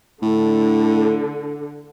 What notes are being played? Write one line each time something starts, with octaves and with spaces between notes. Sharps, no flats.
A2 D3